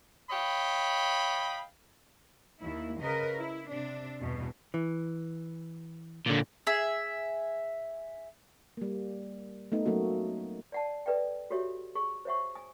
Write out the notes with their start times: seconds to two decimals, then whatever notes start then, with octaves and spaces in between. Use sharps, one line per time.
0.31 C#5 D#5 F5 G5 B5
2.60 D#2 E4
3.01 C#3 A#4 B4 D#5
3.38 E4
3.69 C3 D4
4.20 E2 G2 B2
4.74 E3
6.27 A#2 D3
6.67 G#4 E5
8.77 G3 A#3
9.72 A3 B3 D#4
9.86 F#3 A3 A#3 C#4 F#4
10.72 D5 F#5 A5
11.06 A4 B4 D5 E5 G5
11.50 F#4 G4 A4 C#5 E5
11.95 G#4 C#6
12.25 C5 C#5 E5 F#5 C#6
12.55 G#5 D#6